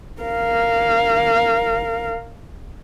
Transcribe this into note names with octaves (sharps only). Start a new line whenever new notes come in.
A#4 F5